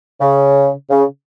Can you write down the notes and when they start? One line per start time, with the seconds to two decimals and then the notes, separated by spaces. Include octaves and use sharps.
0.20 C#3
0.90 C#3